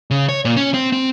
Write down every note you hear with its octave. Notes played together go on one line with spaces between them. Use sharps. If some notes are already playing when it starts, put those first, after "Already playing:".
C#3
C#5
A#2
C#4
C4
C4